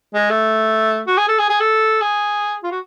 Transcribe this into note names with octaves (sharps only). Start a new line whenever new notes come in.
G#3
A3
F#4
G#4
A4
G#4
G#4
A4
G#4
F4
F#4